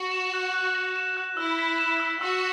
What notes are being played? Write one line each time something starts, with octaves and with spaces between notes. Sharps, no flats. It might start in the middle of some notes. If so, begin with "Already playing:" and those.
Already playing: F#4
E7
F#6
F#6
A#6
E7
F#6
E4 E6
B6
E7
E6
F#4 E6